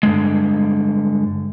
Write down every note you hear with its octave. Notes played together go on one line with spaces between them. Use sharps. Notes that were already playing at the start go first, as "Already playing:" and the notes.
G2 D3 D#3 G#3